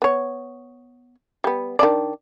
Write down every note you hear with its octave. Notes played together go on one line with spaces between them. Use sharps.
B3 C#5
G3 B3
D#3 D4 D5